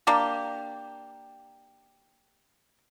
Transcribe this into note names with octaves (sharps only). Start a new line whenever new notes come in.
A#3 D4 G4